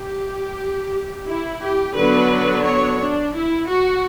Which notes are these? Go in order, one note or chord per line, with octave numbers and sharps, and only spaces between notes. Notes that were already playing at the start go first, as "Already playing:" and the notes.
Already playing: G4
E4
G4
D3 F#3 B3 D4 B4
C#5
D4
E4
F#4